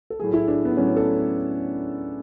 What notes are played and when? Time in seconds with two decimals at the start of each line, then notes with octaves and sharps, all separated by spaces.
0.10 A4
0.19 A2 F#3 A3 G#4
0.33 E4
0.48 D4
0.65 B3
0.77 A2 F#3 A3 C#4
0.97 A4